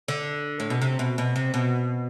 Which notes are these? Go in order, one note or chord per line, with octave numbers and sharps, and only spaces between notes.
D3
A2
B2
C3
B2
B2
C3
B2